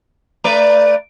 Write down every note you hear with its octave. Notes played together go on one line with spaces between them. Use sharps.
A3 B4 D5